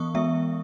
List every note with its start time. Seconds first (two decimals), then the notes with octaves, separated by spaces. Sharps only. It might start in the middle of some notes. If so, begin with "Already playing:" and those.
Already playing: E3 B3 C#6 D#6
0.15 G#3 B3 E5